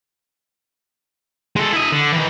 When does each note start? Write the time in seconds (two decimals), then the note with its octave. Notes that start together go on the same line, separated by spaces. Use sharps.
1.56 G#3 A4
1.73 E4 D#5
1.92 D3
2.13 D#3 E3